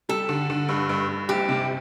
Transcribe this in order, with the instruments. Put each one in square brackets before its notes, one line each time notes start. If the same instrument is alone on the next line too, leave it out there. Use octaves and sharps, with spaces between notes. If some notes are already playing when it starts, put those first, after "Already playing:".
[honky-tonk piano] G3 [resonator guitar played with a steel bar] A4
[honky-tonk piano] D3
D3
G2
G2
G2
[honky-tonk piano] F#1 [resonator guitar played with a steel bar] G4
[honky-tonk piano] C3